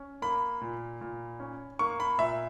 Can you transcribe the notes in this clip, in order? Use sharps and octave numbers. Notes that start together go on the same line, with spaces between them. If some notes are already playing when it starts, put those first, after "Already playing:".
Already playing: C#4
A#3 B5
A#2
A#2
C#4
A#3 C#6
B5
A#2 E5